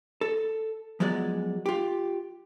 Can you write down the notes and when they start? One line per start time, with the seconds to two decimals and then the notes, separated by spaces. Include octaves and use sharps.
0.21 A4
1.00 F3 F#3 G#3 B3 D5
1.66 F4 G4